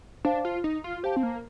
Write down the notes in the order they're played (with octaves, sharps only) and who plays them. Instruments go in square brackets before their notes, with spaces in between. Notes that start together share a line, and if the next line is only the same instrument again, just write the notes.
[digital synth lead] D4 [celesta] C5 F5 A5
[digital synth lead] F4
D#4
F4
[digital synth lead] G4 [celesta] C5 F5 A5
[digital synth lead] C4
A#3